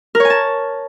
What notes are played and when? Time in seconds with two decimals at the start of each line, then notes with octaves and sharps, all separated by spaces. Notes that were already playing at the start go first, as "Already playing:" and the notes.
0.15 A#4
0.20 C#5
0.25 G#5
0.30 A5